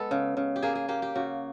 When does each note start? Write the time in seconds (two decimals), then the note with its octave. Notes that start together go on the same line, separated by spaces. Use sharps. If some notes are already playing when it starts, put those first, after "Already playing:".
Already playing: G#3 B3 A4
0.11 C#3
0.37 C#3
0.56 G4
0.63 A#3 G#4
0.75 G#4
0.88 A#3 G4
1.02 G4
1.15 C#3 F#4